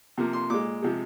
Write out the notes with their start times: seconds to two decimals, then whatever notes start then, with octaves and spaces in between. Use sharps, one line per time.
0.18 C3 F3 A#3
0.33 C6
0.50 A#2 G#3 D6
0.82 C3 F3 G#3